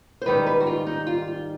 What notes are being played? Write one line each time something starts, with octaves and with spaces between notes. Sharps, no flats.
C5
G#2 D#3 G3 B4
B4
F#4
F4
D#4
F4
F4